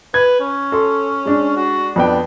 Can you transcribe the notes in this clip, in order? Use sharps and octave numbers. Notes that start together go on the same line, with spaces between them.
B4 G#6
C#4
A4 C6
G#3 D4
F#4
F2 B3 D4 G5